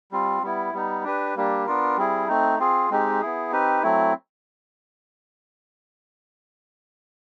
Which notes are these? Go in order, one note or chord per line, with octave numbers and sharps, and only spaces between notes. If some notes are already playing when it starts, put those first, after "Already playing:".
G3 C4 F4
G3 B3 E4
G3 B3 D#4
D4 G4 B4
G3 A#3 D4 G4
B3 D4 F4 A#4
G3 C4 E4 G#4
A3 C4 D#4
C4 F4 G#4
G#3 C4 D#4 G4
B3 E4 G#4
C4 D#4 G4 B4
F#3 A3 C4 E4